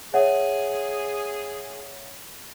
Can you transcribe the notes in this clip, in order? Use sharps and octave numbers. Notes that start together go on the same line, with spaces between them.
G#4 C#5 E5 F#5